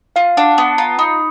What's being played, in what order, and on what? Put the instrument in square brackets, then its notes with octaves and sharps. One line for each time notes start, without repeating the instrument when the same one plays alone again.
[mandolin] F4 [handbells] F5
[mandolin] D4 [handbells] F#5
[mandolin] B3 [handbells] A5
[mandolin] F4 [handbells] A#5
[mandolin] D#4 [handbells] B5